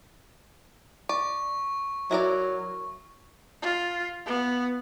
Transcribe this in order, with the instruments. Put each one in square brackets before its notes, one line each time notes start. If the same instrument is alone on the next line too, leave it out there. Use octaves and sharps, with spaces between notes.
[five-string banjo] D5 [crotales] C#6
[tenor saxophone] F#3 [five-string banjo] E4 A#4 D5
[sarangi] F4
B3